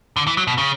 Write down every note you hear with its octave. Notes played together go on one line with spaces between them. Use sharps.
D3
E3
F#3
B2
C#3